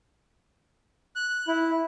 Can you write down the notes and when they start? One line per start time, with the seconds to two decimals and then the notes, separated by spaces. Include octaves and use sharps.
1.16 F#6
1.48 E4